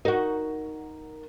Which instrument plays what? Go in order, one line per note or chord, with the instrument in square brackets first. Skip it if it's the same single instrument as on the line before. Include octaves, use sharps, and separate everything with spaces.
[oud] D#4 F#4 [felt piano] A#4